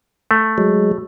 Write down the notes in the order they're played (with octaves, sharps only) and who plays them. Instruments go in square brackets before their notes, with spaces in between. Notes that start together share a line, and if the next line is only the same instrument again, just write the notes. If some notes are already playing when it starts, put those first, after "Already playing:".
[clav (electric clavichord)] A3
[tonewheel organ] F#3 G#3